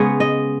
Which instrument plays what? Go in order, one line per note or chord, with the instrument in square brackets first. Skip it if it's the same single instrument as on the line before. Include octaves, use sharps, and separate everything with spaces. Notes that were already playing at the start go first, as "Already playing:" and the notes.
Already playing: [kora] C#3 G#3 B3 C#5
D#5